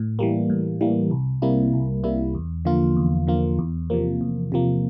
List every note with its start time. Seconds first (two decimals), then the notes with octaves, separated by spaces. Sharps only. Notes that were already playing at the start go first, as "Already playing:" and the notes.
Already playing: A2
0.19 E3 G3 A#3
0.50 A2
0.81 E3 G3 A#3
1.11 C2
1.42 C3 G3 A#3 E4
1.73 C2
2.04 C3 G3 A#3 E4
2.34 E2
2.65 D3 F3 A#3 F4
2.96 E2
3.27 D3 F3 A#3 F4
3.59 E2
3.90 C3 F3 A#3
4.21 E2
4.52 C3 F3 A#3